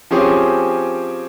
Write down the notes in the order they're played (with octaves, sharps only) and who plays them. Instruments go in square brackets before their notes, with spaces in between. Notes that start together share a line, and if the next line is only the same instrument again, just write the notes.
[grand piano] F3 C4 C#4 G4 G#4 C#5